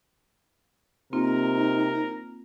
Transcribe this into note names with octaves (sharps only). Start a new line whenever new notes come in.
C3 A#3 C4 D#4 F4 A#4